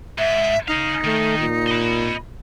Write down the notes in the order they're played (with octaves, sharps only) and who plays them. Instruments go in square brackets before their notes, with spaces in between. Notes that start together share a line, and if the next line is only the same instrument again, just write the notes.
[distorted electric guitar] G#2 [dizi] E5
[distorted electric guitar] C#3 F5 [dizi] D#4
[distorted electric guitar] D#3 [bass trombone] A3
[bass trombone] A#2
[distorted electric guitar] D#5 B5